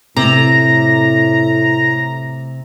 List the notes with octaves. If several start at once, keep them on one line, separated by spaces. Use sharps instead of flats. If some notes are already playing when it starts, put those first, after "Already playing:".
A2 C3 A#5